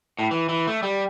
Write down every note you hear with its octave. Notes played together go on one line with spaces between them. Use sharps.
A2
E3
E3
A3
G3